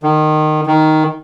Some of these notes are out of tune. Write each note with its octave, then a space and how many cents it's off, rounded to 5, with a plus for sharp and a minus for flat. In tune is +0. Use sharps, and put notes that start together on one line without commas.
D#3 -20
D#3 +5